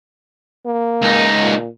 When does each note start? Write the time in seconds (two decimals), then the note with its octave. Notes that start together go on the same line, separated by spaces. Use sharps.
0.65 A#3
1.02 C#2 D#4
1.42 A#2